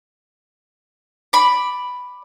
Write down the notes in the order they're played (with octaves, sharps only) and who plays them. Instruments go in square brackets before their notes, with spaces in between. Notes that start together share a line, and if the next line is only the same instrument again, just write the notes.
[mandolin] D5 B5